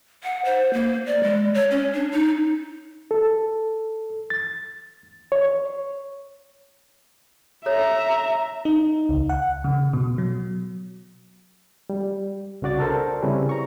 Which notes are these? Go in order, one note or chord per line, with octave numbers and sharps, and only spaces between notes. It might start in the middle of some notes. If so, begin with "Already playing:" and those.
F#5
C5
A#3
D5
G#3
C#5
C#4
D4
D#4
A4
A6
C#5
A4 C#5 E5 A#5
D#4
C#2
F#5
C#3
B2
F#3
G3
C2 C#3 F#4 D5 A6
D4 A4 A#4 C5
C#3 G3 C4 C#4 E4 B4
A#5 C#6